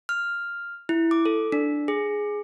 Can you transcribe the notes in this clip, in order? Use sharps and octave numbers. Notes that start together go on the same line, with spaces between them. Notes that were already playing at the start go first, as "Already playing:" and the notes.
F6
E4
D6
A4
D4
G#4